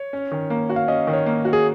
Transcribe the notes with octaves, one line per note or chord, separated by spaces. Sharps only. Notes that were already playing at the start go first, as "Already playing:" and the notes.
Already playing: C#5
C#4
D#3
A#3
F#4
F5
C#4 D#5
D#3
C#5
A#3
F#4
G#4